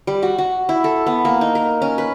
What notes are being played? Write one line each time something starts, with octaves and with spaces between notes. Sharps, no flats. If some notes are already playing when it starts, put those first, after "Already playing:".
G3
F#4
F#4
E4
A4
B3
A#3
D#4
A#4
C#4
B4